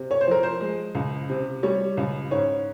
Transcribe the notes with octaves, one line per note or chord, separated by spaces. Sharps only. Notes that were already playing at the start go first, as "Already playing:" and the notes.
Already playing: C3
C#5
C5
F3 A#4
C5
G#3
C#2
C3
G3 C#5
C#2
G#2 C#5